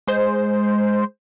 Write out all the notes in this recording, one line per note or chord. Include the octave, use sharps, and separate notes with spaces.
G#3 C5